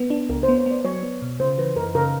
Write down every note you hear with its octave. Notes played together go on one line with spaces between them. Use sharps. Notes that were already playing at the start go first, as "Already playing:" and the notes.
Already playing: B3
D4
C#2 A#4
C5
B3
C#5
B3 D5
F#3 C#5
B3
B2
C#3 C5
E3 B4
F#2 A#4
C#3 A#4